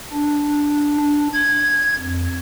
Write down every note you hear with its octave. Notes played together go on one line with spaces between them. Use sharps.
D4
D4
G#6
F2